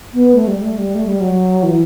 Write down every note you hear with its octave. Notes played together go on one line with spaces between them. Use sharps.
B3
A3
G3
A3
G3
A3
G3
F#3
E3